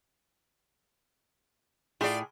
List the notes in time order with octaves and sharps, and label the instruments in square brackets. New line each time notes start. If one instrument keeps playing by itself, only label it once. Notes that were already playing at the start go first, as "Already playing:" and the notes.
[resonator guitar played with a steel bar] A2 G#4 [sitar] F4 D5